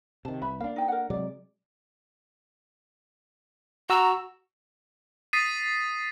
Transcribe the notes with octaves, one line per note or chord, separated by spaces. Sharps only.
C3 D#3 A5
C2 B4 E5 B5
A#3 D4 F5
D#4 G5
A#4 F#5
C3 F#3 G#3 D5
F#4 A#5 E6
D#6 A6 B6 C7 D#7